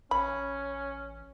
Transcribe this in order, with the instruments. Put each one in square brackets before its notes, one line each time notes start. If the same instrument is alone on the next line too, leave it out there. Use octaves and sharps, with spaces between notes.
[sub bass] A1 [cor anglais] C#4 [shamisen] B5